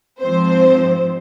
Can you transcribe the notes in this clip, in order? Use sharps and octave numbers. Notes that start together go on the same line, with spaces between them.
G#2 F3 C4 C5